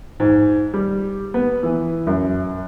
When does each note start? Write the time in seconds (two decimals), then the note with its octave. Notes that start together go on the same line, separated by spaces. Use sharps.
0.20 G#2
0.73 G3
1.34 B3
1.63 E3
2.07 F#2